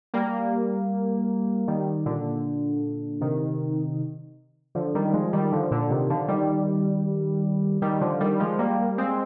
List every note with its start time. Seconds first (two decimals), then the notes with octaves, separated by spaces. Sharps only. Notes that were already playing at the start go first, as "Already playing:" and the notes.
0.14 G3 A#3
1.68 D#3 G3
2.05 A#2 D3
3.21 C3 D#3
4.75 D3 F3
4.95 D#3 G3
5.13 F3 G#3
5.33 D#3 G3
5.52 D3 F3
5.71 A#2 D3
5.90 C3 D#3
6.10 D3 F3
6.28 D#3 G3
7.82 D#3 G3
8.01 D3 F3
8.20 D#3 G3
8.40 F3 G#3
8.59 G3 A#3
8.98 G#3 C4